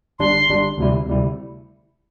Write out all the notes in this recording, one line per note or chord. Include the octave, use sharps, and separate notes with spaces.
G1 G2 G3 D4 C6
G1 G2 G3 D4
D2 C3 G3 E4
D2 C3 G3 E4